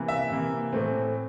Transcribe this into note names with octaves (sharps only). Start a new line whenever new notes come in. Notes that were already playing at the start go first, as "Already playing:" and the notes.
Already playing: C3 E3 A#3
E5
C3 E3 A#3
A2 E3 A3 C4